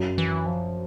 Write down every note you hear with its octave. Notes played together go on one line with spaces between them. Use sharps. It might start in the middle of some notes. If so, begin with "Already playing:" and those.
Already playing: F#2
E3
F3